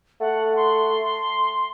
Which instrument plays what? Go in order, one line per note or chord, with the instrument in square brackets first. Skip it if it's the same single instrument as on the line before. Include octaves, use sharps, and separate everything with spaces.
[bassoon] A3 [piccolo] F#5
[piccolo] C6